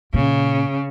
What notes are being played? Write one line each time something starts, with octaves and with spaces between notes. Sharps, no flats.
A#2 C#3